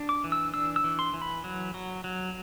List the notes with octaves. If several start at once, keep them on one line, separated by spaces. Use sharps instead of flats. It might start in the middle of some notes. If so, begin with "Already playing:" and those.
Already playing: D4
D6
E3
E6
D4 E6
E6
E3
C6
E3
B5
F#3
F#3
F#3